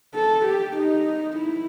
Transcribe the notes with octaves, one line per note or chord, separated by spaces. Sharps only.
A4
G4
D#4
E4